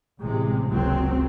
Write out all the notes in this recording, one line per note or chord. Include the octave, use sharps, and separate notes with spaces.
A1 C3 G#3
F#1 C#2 F#3 C4